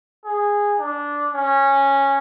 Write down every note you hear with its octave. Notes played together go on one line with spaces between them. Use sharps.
G#4
D4
C#4